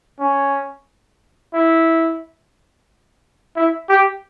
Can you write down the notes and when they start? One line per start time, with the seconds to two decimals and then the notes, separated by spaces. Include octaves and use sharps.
0.19 C#4
1.54 E4
3.56 E4
3.89 G4